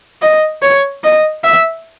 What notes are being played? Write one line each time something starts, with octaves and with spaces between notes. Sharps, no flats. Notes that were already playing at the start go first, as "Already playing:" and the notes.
D#5
C#5
D#5
E5